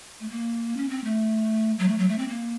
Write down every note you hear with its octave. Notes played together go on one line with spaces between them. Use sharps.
A3
A#3
C#4
C4
A3
F#3
A3
F#3
A3
C4
A#3